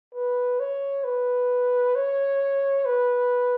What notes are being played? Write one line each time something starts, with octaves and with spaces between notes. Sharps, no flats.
B4
C#5
B4
C#5
B4